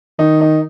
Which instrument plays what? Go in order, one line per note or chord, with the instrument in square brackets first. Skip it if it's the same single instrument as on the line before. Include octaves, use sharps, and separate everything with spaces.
[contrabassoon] D#3 [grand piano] D#4
[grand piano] D#4